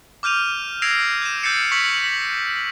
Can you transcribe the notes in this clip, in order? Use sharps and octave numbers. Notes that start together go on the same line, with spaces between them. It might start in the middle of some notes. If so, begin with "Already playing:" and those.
D6 F6 G6 D#7 F7
E6 G#6 A#6 C7 D7 F7
G6 E7
E6 G6 A6 C7 C#7
C#6 E6 B6 C#7 F#7
B6